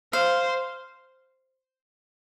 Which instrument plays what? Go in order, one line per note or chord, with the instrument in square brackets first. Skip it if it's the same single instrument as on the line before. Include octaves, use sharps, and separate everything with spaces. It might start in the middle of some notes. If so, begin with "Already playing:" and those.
[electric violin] C5 [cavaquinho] F5